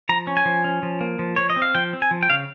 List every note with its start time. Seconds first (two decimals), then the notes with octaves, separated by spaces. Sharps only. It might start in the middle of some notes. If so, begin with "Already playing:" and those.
0.09 F3 A#5
0.27 C#4
0.37 G#5
0.45 F3
0.64 C#4
0.83 F3
1.01 A#3
1.19 F3
1.36 F3 C#5
1.50 D#5
1.56 C4
1.62 F5
1.75 F3 G5
1.93 C4
2.02 G#5
2.11 F3
2.23 G5
2.30 C#3 F5